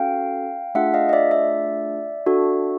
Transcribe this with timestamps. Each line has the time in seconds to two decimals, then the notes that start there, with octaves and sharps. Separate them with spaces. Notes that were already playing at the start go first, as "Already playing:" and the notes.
Already playing: C#4 F#4 A4 F5 G5
0.75 A3 D4 F4 G#4 E5 F#5
0.94 D#5 F5
1.09 D#5
1.13 D5 E5
1.31 D5 E5
2.26 D4 F#4 A4